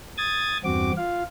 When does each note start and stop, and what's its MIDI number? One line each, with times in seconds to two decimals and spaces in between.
0.18 0.58 87
0.18 0.58 92
0.18 0.58 93
0.64 0.92 40
0.64 0.92 43
0.64 0.92 60
0.64 0.92 66
0.64 0.92 86
0.97 1.23 65
0.97 1.23 77